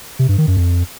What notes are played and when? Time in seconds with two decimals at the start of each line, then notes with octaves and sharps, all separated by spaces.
0.19 C3
0.29 G2
0.38 D#3
0.48 F#2
0.57 F2